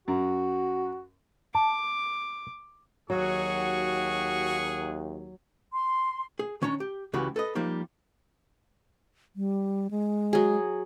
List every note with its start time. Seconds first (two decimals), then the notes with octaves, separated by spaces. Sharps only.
0.08 F#2 F#4
1.55 A5 D6
3.10 D#2 F#3 F#4 G#4 F#5 C#6
5.72 C6
6.39 G#4
6.62 D#3 C#4 D4 C#5 A#5
6.80 G4
7.13 C#2 C#3 E3 F#4 G4 B4
7.36 A4 B4 D#5
7.55 F3 G3 A#3 D#4
9.36 G3
9.91 G#3
10.33 F#3 G#4